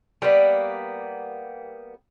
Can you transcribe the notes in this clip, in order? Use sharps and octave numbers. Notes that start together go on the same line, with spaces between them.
G3 A#3 B3